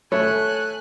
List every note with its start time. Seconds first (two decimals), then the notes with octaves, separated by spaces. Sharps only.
0.12 A3 C#5 G#5 F#6